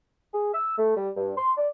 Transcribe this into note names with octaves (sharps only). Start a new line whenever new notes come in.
G#4
E6
A3
G3
G2
C6
D5